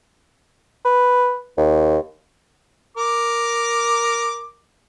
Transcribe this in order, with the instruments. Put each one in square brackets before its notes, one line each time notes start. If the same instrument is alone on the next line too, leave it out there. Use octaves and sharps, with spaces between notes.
[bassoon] B4
D#2
[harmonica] A#4 D6